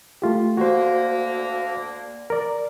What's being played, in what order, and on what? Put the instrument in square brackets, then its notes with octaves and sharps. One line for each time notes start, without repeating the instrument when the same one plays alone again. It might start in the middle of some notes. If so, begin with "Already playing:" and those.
[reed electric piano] A3 F4 G4
[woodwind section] D2 D3 A#3 [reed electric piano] F#4 C5
[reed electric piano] A#4 D5